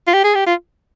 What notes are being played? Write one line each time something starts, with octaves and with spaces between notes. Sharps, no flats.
F4
G4
G#4
G4
F4